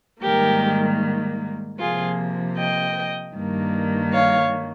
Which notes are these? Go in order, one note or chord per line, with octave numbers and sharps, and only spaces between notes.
G#2 D#3 G3 A#3 G4 A#4
C3 F3 A#3 F4 G#4
D#5 G5
G2 D#3 G3 A#3
C#5 F5